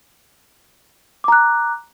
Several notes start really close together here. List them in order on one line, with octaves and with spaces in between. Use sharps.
D6 A#5 F#6